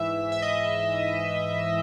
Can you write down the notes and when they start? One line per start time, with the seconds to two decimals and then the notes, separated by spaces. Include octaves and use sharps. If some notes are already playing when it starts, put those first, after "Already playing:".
Already playing: G#2 E3 E5
0.32 E5
0.42 D#5